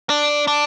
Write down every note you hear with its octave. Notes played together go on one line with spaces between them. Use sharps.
D4
D4